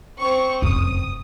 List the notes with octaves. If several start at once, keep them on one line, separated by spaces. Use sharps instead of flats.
C4 C#6
F1 F#2 D#6